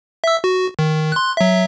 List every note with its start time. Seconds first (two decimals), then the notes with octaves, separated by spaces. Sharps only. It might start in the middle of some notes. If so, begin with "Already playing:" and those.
0.24 E5 E6
0.44 F#4
0.79 D#3
1.12 C6 F#6
1.37 F#3 E5